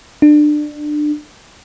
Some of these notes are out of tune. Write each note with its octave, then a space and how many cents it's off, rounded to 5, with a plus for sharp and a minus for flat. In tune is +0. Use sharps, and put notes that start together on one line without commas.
D4 +25